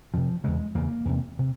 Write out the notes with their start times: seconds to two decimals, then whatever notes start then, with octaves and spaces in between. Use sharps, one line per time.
0.14 F2 C3 F3
0.44 E2 C#3 G#3
0.75 E2 C#3 A#3
1.05 E2 C3
1.39 C3